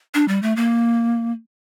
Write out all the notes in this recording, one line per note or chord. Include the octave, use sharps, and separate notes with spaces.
D4
G3
A3
A#3